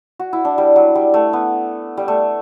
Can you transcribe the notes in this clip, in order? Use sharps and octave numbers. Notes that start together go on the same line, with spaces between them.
F#4
E4
D4
G3
F#3
G3
A3
B3
G3
A3